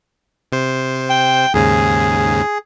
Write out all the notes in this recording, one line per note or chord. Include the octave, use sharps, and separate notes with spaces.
C3 C5
G5
D#2 G#2 C#3 G#4